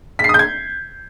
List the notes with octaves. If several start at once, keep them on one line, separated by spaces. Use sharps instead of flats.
B6
C7
D#6
G6
G#6